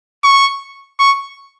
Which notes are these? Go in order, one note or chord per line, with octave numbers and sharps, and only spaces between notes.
C#6
C#6